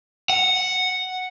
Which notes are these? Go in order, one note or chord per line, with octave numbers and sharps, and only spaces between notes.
F#5